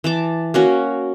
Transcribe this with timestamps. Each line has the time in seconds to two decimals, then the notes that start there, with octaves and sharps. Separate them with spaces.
0.04 E3 A5 D6
0.54 A#3 C#4 F#4